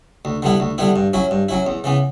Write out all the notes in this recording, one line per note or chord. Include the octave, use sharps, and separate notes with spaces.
D2
D3 G3 B3 E4
D2
D3 G3 B3 E4
G2
F#3 C#4 E4
G2
F#3 C#4 E4
E2
C#3 E3 B3